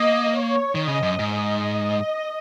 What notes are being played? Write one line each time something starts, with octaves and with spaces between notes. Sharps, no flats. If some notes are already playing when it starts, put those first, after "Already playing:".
Already playing: A#3 D#5
C#5
D#3
C#3 D#5
F#2
G#2
D#5